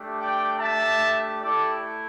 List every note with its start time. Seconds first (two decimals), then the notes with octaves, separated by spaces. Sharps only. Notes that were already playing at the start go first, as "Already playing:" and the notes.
Already playing: A3 D4 G4
0.20 D5 G5
0.60 E5 A5
1.40 A3 E4 G4 A4 D5